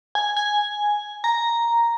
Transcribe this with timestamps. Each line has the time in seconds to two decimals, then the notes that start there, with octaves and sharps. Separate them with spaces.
0.15 G#5
0.37 G#5
1.24 A#5